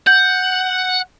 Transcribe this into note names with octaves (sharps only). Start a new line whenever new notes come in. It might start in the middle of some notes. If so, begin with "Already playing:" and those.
F#5 G6